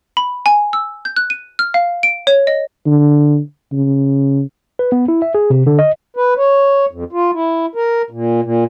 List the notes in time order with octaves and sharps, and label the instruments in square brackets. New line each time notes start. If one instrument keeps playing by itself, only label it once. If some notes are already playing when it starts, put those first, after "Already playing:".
[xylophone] B5
G#5
E6
G6
F#6
D#7
F6
F5
D7
C#5
D#5
[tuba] D3
C#3
[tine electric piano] B4
B3
E4
E5
G#4
C3
D3
D#5
[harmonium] B4
C#5
F2
F4
E4
A#4
A#2
A#2